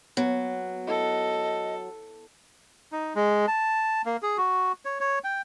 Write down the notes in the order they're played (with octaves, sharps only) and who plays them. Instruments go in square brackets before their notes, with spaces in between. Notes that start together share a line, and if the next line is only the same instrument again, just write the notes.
[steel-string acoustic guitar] F#3 [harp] B3
[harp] E4 [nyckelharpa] A4 [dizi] D#5
[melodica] D#4
G#3
A5
A#3
G#4
F#4
C#5
C#5
G5